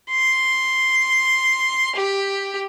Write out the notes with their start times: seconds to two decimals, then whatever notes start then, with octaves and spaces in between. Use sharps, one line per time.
0.11 C6
1.95 G4